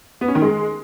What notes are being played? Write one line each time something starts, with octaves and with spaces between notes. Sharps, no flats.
B3
C#4
D#3
G#3